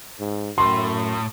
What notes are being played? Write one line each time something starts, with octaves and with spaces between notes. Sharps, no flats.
G#2
F#2 A2 C6